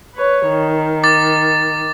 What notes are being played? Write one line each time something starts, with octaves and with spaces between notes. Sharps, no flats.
B4 C#5
D#3
D6 A6